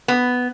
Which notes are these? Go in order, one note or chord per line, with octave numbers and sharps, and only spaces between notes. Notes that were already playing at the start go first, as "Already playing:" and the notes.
B3